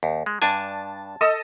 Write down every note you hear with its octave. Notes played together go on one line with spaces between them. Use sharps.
D#2
G#3
G2 D4 G#5 A5
A4 D#5 E6